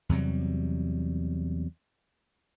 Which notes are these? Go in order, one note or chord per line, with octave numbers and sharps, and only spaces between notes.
E2 C3 F#3 G3